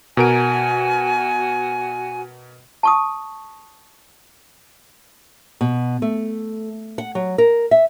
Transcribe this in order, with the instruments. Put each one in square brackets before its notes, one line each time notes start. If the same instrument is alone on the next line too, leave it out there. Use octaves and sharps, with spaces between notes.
[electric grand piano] B2 A#4 D7 [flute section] F#4 G#5
[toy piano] A5 C#6 D#6
[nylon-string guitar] B2
A3
F#5
F#3
A#4
E5